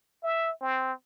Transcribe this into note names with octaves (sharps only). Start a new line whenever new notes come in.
E5
C4